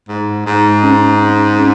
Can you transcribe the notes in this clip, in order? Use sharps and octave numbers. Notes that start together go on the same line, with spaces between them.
G#2
G#2
C#4
C#4
C#4